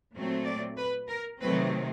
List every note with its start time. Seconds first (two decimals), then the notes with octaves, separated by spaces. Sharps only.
0.14 A#2 F#3 A3 C4
0.44 D5
0.77 B4
1.08 A#4
1.40 C3 D#3 F#3 A3 C4 B4